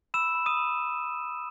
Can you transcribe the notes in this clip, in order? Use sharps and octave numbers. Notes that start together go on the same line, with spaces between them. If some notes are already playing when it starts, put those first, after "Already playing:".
B5 E6 E7
B5
D#6 D#7
B5